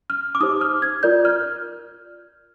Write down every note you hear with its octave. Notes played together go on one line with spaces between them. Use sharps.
F6
D6
D#4 G4 C5 D#6
F6
G#6
F4 A#4 D5 G6
F6